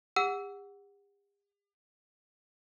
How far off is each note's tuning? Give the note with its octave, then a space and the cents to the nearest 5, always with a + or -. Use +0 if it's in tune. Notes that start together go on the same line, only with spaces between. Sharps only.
G4 +45 F#5 +0 E6 +0